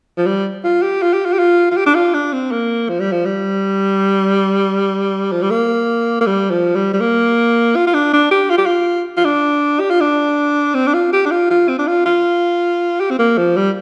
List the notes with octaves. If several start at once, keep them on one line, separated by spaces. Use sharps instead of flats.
F3
G3
F4
G4
F4
G4
F4
G4
F4
F4
G4
D4
F4
D4
C4
A#3
F3
G3
F3
G3
F3
G3
A#3
A#3
G3
F3
G3
G3
A#3
F4
F4
D4
D4
G4
F4
G4
F4
F4
D4
G4
F4
D4
C4
D4
F4
G4
D4
F4
F4
C4
D4
F4
F4
G4
C4
A#3
F3
G3